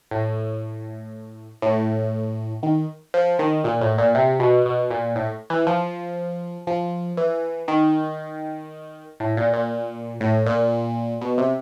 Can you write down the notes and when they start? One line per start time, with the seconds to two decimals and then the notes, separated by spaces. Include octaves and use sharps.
0.11 A2
1.62 A2
2.63 D#3
3.14 F3
3.39 D#3
3.64 A#2
3.81 A2
3.98 A#2
4.15 C3
4.40 B2
4.66 B2
4.91 A#2
5.16 A2
5.50 E3
5.67 F3
6.67 F3
7.17 E3
7.68 D#3
9.20 A2
9.37 A#2
9.53 A#2
10.21 A2
10.46 A#2
11.21 B2
11.38 C3